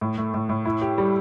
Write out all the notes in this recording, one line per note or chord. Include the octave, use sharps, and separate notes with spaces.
A2
A3
A2
A2
E4
G4
G3